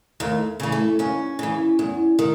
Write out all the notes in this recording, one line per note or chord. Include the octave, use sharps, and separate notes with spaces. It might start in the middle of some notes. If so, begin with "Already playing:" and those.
D#2 A3
C#3 E3
A3
D#2 C#4
C#3 E3
E2
D#3